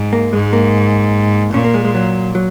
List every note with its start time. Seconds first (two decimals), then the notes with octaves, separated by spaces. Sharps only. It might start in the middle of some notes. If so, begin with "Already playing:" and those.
Already playing: G#2
0.13 A#3
0.33 G#2 G#3
0.53 A#3
1.54 A#2 C#4
1.64 A#3
1.74 G#3
1.84 G#3
1.95 F#3
2.35 F#3